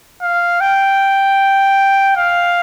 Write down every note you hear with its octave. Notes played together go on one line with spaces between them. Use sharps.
F5
G5
F5